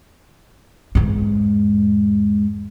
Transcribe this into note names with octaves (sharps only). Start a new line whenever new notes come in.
E2 G#2